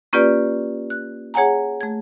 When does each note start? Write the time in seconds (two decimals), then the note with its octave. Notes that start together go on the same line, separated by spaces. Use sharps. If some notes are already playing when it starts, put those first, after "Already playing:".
0.13 A#3 C#4 F4 G4 B4 D5
0.90 F#6
1.34 G#4 C#5 F#5 G#5 A#5
1.81 A3 G#6